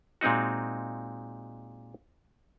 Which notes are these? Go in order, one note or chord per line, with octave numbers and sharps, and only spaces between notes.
A#2 G#3 C4 D#4 F#4